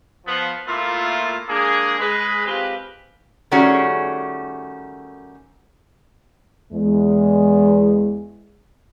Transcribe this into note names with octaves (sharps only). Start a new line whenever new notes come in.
F3 B3
A#2 A3 A#3 E4 F4
G#3 A#3 D4 G#4
G#3 G#4 B4
G#3 C4 F4 G4 B4
D#3 G3 A3 C#4 F#4 G#4
E2 G#3